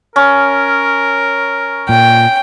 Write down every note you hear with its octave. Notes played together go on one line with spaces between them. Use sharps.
C#4 A#4
A#2 G5